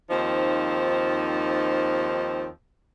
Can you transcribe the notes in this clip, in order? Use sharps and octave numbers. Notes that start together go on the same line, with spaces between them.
D#2 F3 C4 D#4